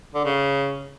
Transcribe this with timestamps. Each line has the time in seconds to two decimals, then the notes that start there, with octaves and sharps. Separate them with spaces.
0.14 D3
0.25 C#3